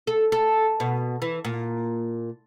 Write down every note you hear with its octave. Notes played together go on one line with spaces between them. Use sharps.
A4
A4
B2
E3
A#2